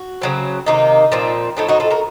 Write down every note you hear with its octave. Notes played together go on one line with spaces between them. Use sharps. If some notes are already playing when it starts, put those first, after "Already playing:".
Already playing: F#4
C#3 F#3 C4
C3 D#3 A#3 D#4
A#2 F3 C4
A2 A3 C4 D#4
D#4 F#4
F4 A4
F#4 A#4